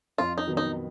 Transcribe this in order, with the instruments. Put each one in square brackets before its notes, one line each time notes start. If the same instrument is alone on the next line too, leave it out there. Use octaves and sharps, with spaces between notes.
[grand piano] F2 [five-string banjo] F4
[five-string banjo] D#4
[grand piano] D#3 F#3 B3
[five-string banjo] D#4